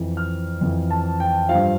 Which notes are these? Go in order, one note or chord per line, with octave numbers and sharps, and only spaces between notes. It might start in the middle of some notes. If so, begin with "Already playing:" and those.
Already playing: F2 E3
F6
F2 E3
A5
G5
G2 F3 F5